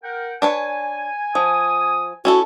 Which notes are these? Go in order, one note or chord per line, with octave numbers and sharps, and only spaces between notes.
A#4 F#5 G5
D4 B4 C#5 G#5
F3 D#6
C#4 E4 F#4 A4